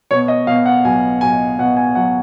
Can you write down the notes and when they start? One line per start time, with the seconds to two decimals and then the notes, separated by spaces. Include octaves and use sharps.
0.11 B2 C#5
0.28 D#5
0.47 B2 F5
0.66 F#5
0.85 B1 G#5
1.21 B1 G#5
1.59 B2 F#5
1.77 G#5
1.95 F#3 F#5